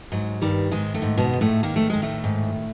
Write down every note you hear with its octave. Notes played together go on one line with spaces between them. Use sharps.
G#2 F#3
G2 D#3 G3
G#2 D#3 G#3
A2 A3
G#2
B2 B3
G#2
A2 A3
D#3 A#3
A3
D#3 G#3
A2 A3
G#2